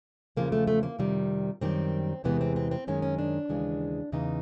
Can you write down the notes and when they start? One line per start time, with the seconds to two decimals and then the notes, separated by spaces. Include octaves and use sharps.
0.36 E2 C#3 F3 A#3
0.52 A3
0.67 A3
0.83 A#3
0.99 F2 C3 D#3 G3
1.61 F#2 D#3 G3 C4
2.24 E2 C3 E3 G#3 B3
2.41 C4
2.56 C4
2.71 C4
2.87 F#2 D#3 G#3 C#4
3.02 C#4
3.18 D4
3.49 D#2 C#3 E3 G#3
4.12 E2 C#3 E3 D#4